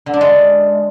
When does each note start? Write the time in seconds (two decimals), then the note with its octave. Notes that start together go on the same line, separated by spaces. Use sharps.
0.06 D3
0.14 D4
0.21 G#3